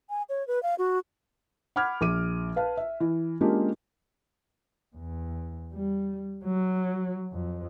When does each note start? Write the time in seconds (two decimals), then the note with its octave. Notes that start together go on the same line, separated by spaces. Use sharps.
0.10 G#5
0.29 C#5
0.48 B4
0.63 F5
0.78 F#4
1.76 F#5 B5 D6 F6 G#6
2.01 A#1 D6 D#7
2.56 B4 F5 A5
2.77 E5
3.00 E3
3.41 G#3 A#3 C#4 D4 F4 G4
4.96 E2
5.73 G3
6.45 F#3
7.33 F2